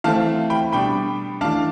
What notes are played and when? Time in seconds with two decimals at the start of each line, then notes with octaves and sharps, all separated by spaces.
0.04 E3 A3 C4 F5 A5
0.50 G5 B5
0.73 B2 G3 D4 G5 B5
1.41 E3 A3 D4 F5 A5